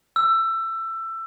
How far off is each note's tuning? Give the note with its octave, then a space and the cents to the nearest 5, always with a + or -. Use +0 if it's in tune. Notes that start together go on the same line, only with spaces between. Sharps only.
E6 +20